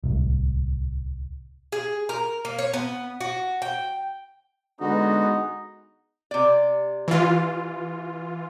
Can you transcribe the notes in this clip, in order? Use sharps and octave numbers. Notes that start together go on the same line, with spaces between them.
D1 C2
G#4
A#4
A#3
C#5
B3
F#4
G5
D3 G#3 B3 D#4 F#4
C3 D5
E3 F4